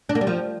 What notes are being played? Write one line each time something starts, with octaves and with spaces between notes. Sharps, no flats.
D4
A#3
G3
F3